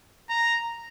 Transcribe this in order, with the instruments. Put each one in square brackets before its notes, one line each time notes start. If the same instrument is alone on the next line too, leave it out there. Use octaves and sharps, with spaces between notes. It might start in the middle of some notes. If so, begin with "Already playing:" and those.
[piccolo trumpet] A#5